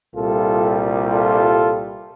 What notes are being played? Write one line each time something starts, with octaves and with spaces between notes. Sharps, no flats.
C2 A#2 G3 F4 A4
F4 A4